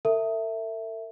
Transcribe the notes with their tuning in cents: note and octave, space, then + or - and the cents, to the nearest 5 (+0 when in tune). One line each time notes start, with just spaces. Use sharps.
A4 +45 E5 +0